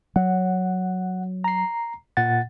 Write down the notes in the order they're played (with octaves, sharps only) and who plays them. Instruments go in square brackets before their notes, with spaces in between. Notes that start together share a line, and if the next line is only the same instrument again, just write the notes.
[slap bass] F#3 [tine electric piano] F#5
[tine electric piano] A#5 C7
A#2 F#5 A6